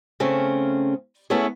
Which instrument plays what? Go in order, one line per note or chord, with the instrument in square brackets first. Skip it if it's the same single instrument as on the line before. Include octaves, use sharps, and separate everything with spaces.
[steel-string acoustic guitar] C#3 A3 C4 C#4
A3 B3 C#4 E4 G#4